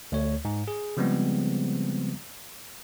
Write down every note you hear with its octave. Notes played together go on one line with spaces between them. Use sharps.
D2 A3 C#5
G#2
G#4
C#3 F3 G3 G#3 B3 C4